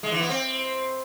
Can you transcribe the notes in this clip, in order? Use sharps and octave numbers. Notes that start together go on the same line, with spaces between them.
G#3
E3
B3
C4